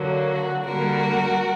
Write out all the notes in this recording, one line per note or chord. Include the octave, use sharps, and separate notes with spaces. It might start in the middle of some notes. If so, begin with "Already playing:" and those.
Already playing: D3 F#3 A#3
F#4
D3 G3 A#3 F#4 A#4